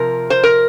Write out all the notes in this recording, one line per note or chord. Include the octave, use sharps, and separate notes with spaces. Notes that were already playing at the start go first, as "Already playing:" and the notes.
Already playing: C3 F3 A#4
C5
A#4